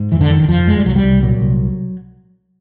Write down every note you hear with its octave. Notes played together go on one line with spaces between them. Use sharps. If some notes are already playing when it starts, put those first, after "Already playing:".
Already playing: G#2
F2 E3
D3
F#1 D#3
D#3
F2 F3
F#1 G#3
G3
C2 F#3
G3
C2
A#2 F#3
C2